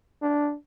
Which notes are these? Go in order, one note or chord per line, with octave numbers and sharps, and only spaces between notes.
D4